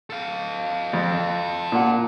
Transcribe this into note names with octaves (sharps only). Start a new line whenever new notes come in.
A4 F5
F2
A#2 F#5